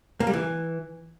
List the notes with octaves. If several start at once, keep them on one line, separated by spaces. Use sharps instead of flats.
A#3
G3
E3